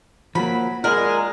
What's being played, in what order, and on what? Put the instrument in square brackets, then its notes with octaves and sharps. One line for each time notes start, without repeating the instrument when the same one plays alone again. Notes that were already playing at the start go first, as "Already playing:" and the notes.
[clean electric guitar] F3 A#3 [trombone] F#3 [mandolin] B5
[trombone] G#3 [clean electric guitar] F4 D5 F#5 [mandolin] A#4